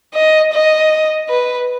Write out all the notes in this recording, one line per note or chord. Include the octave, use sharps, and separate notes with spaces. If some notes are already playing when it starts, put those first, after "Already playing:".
D#5
D#5
B4